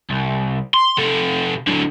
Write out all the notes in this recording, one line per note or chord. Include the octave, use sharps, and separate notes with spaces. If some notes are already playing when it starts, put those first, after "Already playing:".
C2
C6
C3 A4
D3 F#3